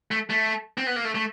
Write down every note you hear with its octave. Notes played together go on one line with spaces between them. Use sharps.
A3
A3
C4
B3
A#3
A3
A3